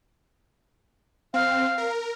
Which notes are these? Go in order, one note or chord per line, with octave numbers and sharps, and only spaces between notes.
C4 F5
A#4